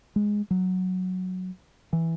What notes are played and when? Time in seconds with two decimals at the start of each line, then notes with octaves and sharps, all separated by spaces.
0.16 G#3
0.51 F#3
1.93 E3